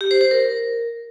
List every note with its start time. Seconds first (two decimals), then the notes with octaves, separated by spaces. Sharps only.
0.01 G4
0.11 C5
0.21 C5
0.31 A#4